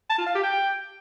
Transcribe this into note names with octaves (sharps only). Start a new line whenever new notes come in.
A5
F4
F5
G4
G5